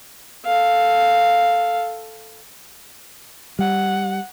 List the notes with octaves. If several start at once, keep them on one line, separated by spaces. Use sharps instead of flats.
A4 F5
G3 F#5